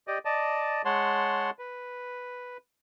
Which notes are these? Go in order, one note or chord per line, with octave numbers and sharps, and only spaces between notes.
G4 D5 D#5
D5 D#5 A5
G#3 C#5 F#5 A5 C6
B4